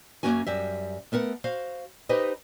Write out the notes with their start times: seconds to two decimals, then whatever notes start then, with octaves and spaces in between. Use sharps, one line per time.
0.23 F#2 C3 A#3 C#4 F#4 G#5
0.46 F#2 G3 E5
1.12 A3 B3 A#4 F#5
1.44 F#4 C5 F5
2.09 D#4 G4 B4 C5 D#5